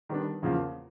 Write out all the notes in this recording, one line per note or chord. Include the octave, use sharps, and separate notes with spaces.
D#3 G3 B3 D4
E2 C#3 F3 A#3